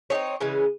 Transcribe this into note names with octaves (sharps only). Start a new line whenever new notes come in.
C4 D#4 G#4 C#5
C#3 E3 G#3 C#4